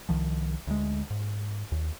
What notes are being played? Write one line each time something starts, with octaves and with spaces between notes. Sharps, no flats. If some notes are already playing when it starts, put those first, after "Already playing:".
C2 D#3 F3
D2 G#3
G#2
D#2